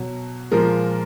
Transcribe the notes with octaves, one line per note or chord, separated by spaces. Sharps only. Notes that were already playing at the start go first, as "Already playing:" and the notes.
Already playing: B2 F#3
A#2 F3 G#3 A#4